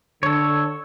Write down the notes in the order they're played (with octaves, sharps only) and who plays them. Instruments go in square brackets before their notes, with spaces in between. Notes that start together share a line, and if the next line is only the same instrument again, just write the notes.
[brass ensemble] D3 [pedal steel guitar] A4 C#5